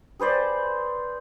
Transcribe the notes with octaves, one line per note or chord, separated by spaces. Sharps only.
G#4 B4 C5 D5